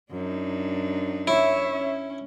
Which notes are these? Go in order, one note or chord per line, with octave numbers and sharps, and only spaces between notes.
F#2 D4 D#4
E4 C#5 E5
C#4